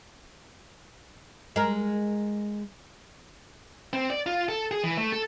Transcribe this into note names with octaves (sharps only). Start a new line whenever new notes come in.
G#3 A#4
C4
D5
F4
A4
G#4
E3
A3
A4